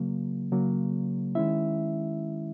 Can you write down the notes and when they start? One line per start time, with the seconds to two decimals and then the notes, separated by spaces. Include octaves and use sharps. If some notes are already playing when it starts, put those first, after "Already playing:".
Already playing: C#3 F#3 A#3
0.51 C#3 F#3 A#3
1.35 D#3 G#3 C#4 E4 E5